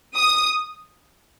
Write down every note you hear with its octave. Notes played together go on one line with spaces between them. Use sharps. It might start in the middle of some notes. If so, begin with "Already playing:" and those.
D#6